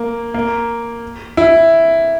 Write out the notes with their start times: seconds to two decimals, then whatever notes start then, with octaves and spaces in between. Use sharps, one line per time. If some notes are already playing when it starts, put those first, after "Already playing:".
Already playing: A#3
0.34 A#3
1.37 E4